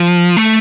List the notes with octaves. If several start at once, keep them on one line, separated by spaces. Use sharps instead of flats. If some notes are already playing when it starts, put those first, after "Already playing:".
Already playing: F3
A3